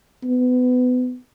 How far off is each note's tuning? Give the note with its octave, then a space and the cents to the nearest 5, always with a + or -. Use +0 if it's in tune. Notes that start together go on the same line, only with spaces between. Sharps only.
B3 +25